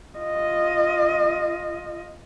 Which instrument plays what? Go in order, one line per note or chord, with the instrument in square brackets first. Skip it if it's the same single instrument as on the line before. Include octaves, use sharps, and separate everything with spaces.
[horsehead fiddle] F4 D#5